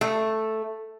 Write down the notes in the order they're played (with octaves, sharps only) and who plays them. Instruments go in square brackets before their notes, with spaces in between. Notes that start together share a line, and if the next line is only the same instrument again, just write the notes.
[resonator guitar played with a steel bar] A3